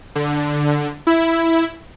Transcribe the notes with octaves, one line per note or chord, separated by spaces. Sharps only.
D3
E4